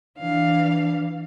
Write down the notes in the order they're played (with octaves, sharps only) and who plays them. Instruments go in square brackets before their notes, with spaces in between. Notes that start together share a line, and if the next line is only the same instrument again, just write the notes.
[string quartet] E3 D4 F5